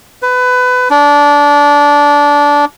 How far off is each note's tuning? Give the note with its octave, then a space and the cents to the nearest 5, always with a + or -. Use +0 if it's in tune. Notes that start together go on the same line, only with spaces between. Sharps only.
B4 +25
D4 -20